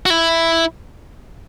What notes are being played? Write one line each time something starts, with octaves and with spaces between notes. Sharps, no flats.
F#4
E4